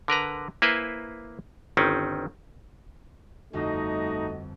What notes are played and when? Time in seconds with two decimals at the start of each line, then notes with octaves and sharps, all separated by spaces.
0.08 D3 A#4 B4 A#5
0.62 A#3 E4 B4 C5 G#5
1.77 G1 D#3 C4 C#4
3.53 G1 F2 A3 D#4 F4 F#4 D#5